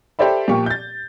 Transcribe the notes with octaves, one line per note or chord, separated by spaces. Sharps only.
G4 A4 C5 D5 E5 B5
A#2 F3 G4 C#6
G6 A6